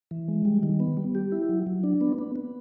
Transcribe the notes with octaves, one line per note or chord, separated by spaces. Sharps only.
E3
G#3
G3
D#3
B3
G3
G4
E4
F#3
F#3
D4
B3
B3
B3